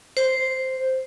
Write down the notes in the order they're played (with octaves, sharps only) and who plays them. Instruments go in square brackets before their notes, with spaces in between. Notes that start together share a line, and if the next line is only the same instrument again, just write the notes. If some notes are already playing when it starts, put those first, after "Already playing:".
[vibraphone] C5